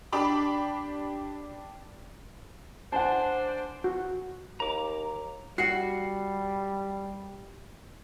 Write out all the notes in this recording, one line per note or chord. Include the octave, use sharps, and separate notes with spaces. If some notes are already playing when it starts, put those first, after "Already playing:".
D4 G4 B5 D6
D4 C5 F#5 G#5 A5
F#4
D#2 A#5 D6
G3 F#4 F#5 C7